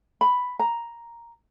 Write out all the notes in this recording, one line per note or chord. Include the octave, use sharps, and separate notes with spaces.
B5
A#5